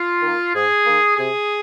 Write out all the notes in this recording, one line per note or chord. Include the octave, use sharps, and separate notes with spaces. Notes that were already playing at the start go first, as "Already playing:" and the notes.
Already playing: F4
D#3 A#3
G#2 G#4
D#3 A#3
C3 G#4